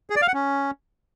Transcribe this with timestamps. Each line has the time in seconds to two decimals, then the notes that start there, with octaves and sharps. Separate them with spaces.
0.10 G#4
0.16 D5
0.22 F5
0.28 F#5
0.34 C#4